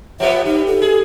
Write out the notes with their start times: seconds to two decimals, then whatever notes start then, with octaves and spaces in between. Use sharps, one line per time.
0.20 F3 G3 B3 E5
0.46 G3 D#4
0.67 A4
0.82 G#4